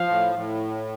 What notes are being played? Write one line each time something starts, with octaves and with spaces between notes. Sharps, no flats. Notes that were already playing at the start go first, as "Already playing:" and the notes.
Already playing: F3 F5
A2
A2